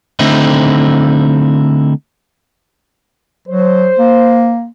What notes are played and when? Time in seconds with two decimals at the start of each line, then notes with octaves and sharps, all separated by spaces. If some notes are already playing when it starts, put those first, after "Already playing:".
0.19 D3 A3 C4 D#4 E4
3.48 F#3 C5
3.99 A#3